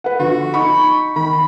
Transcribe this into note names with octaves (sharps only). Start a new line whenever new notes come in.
B4 F#5
D3 F3 F#4
D#4 B5 C#6
D#3 B5